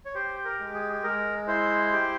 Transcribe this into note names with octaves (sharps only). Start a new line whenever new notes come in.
C#5
G4 C5
A#4
G#3
G#4
G#4
G#3 A#4
E4 C5
G4